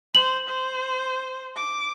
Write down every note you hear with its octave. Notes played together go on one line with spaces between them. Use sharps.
C5 F#7
C5
D6